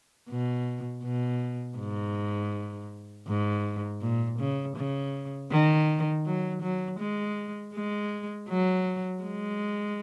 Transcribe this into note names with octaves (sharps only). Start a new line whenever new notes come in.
B2
B2
G#2
G#2
A#2
C#3
C#3
D#3
F#3
F#3
G#3
G#3
F#3
G#3